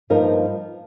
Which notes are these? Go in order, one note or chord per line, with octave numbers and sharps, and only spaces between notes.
G2 F3 A#3 D#4 A#4